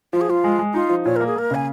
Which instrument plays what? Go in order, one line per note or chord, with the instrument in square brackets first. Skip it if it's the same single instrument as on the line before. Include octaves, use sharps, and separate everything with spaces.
[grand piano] F3 [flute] F4
[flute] G#4
[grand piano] F3 [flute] F4
[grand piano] G#3
G#3
[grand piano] D#4 [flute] F4
[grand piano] F3
[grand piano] A#2 [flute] C#5
[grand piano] A#3 [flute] A#4
[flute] G#4
[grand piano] A#3 [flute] A#4
[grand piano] C#3 [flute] G#5